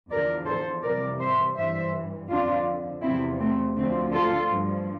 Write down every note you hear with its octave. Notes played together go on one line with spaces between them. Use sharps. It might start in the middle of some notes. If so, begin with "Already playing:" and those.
E2 D3 F3 A#4 D5
A4 C5
F2 C3 E3 G3 A#4 D5
C5 E5
G2 E3 G3 C5 E5
F2 D3 F3 D4 F4
E2 C3 F3 C4 E4
A3 C4
D2 D3 F3 A3 C4
F4 A4
G2 F3